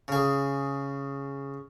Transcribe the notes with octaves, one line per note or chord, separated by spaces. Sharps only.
C#3 G#4